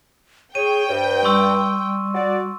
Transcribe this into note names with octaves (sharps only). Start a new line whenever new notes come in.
G#4 C#5 G5 D#7
G2 C5
G3 C6 C#6 E6
F#4 D5